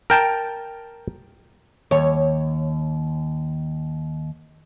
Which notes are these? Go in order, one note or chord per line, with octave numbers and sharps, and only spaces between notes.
A#4 G5 A5
D#2 C#5